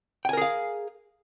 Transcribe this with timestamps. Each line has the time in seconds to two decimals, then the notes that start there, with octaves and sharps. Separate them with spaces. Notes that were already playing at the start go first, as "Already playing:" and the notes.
0.25 G5
0.29 G#5
0.33 A#4
0.37 G#4
0.41 F5